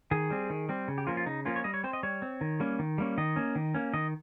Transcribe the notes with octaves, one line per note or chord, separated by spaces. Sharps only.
D#3 G#4
G3 C4
D#3
G3 C4
C#3
G4
F3 A#3 C#4 F4
F4
C#3 D#4
F3 A#3 C#4 F4
C#5
G3 D#5
C#5
C4 C5
D#5
G3 C#5
C4
D#3
G3 A#3 C#4
D#3
G3 A#3 C#4
D#3 D#5
A#3 C#4
D#3
A#3 C#4
D#3 D#5